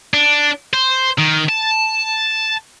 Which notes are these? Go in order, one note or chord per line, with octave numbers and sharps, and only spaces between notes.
D4
C5
D#3
A5